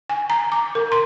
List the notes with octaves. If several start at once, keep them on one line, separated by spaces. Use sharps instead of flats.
G#5
A#5
D6
A#4
C6